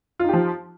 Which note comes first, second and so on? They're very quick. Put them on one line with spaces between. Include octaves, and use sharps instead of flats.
F4 D#4 G4 F3